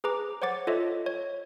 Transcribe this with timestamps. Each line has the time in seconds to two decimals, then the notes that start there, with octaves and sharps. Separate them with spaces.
0.04 G#4 B4 A#5 D6
0.42 C5 C#5 F#5 D6 A6
0.67 F4 A4 C#5 D#5 E5
1.06 C#5